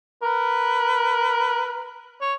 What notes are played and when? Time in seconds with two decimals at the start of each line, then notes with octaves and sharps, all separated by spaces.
0.23 A#4 B4
2.21 C#5